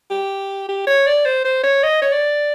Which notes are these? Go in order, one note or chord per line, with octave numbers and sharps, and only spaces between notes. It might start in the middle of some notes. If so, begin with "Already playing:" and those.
G4
G4
C#5
D5
C5
C5
C#5
D#5
C#5
D5